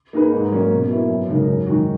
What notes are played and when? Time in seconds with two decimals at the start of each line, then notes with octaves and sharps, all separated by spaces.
0.13 A#3 D#4 G#4 B4
0.32 G#2
0.52 F#3 A#3 C#4
0.71 B2
0.90 A#3 E4 B4
1.09 F#2
1.29 C#3 G#3 D#4 A#4
1.47 F#2
1.66 D#3 G#3 D#4 F#4